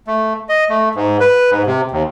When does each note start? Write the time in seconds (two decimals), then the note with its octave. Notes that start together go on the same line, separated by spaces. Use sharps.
0.07 A3
0.49 D#5
0.70 A3
0.95 G#2
1.20 B4
1.51 G#2
1.66 C3
1.91 D#2